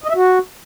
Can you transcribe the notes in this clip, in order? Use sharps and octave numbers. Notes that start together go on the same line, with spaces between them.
D#5
E5
F#4